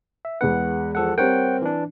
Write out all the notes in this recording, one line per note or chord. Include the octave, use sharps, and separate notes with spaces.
E5
E2 G#3 B4 F#5
F3 A4 F#5
G3 C4 A#4 C#5 F#5 G5
E3 D4